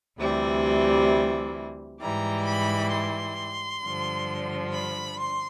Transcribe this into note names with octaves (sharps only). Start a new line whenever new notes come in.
D2 C3 E3 G3
G#2 E3 G3 A#5
B5
C6
G2 D3 F3
B5
C6